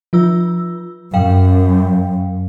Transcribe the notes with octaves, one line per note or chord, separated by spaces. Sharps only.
F3 F4 E6
F#2 F5 G5